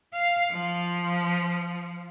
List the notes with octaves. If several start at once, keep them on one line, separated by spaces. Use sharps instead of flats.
F5
F3